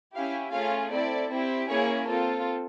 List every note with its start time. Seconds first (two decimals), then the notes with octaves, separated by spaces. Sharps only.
0.15 C#4 E4 G4 F5
0.53 A3 C#4 F4 G#4 F5
0.92 C4 E4 A4 D5
1.31 C4 E4 G4
1.69 A#3 C#4 E4 G#4 C#5
2.07 C4 F4 A4